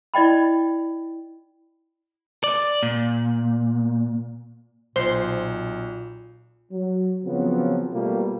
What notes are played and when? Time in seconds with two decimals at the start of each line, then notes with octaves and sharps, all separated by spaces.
0.14 E4 D5 D#5 G5 B5
2.44 D5
2.83 A#2
4.96 B1 A#2 C5
6.71 F#3
7.24 C#3 F3 F#3 B3 C4
7.92 B2 G3 A3 A#3 F4